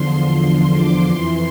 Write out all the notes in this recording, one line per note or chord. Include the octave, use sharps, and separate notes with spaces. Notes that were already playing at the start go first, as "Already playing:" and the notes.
Already playing: E2 D3 F3 C6
D6
F2 E3 C6